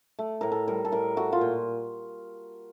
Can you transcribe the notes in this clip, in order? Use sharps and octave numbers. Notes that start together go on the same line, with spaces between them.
A3
A2 A#4
A4
G3 A#4
A4
A2 A#4
A3 F#4
F4
A#2